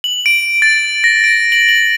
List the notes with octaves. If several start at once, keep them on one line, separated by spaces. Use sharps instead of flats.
F#7
D7
A6
A#6
D7
F#7
F#7